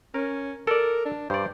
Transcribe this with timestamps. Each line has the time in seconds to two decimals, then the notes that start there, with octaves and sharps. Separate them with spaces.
0.14 C#4 A#4
0.67 A4 A#4 D5
1.05 D4
1.30 G2 C5 D5